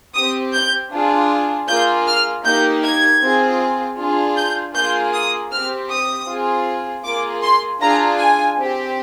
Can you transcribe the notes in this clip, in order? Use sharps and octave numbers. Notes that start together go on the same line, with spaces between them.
C4 G4 D#6
G6
D4 F4 G#4
A#3 F4 G#4 G6
F6
A#3 D#4 G4 G6
G#6
C4 F4 G#4
D4 F4 G#4
G6
A#3 F4 G#4 G6
D#6
C4 G4 F6
D#6
C4 F4 G#4
A#3 F4 G#4 D6
C6
D4 F4 G#4 A#5
G#5
C4 G4